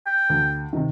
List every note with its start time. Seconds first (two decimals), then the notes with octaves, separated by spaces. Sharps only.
0.06 G5
0.30 D2
0.73 C3 D#3